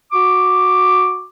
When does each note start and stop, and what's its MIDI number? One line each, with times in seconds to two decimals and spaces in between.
0.13 1.24 66
0.13 1.24 85
0.13 1.24 86